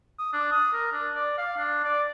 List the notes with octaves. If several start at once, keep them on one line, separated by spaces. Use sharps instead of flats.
D#6
D4
D#6
A#4
D4
D5
F5
D4
D5